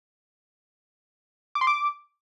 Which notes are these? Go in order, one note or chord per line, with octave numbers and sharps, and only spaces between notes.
D6
C6
D6